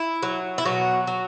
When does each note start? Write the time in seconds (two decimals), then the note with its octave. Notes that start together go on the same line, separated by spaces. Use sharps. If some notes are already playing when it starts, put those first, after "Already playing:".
Already playing: E4
0.23 F#3
0.58 E4
0.65 B2 F#3 F#4
1.07 F#3